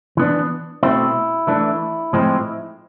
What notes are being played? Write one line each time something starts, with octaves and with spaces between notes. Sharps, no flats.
E3 B3 D4
B2 A3 C4 E4
E3 A3 D4
A2 F3 G#3 C4